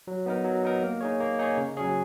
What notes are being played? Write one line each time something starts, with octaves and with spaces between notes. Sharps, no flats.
F#3
B3 D#4 A#4
F#3
B3 D#4 A#4
A#3
D#4 G#4 C#5
A#3
D#4 G#4 C#5
C#3
F#3 C#4 G#4 C#5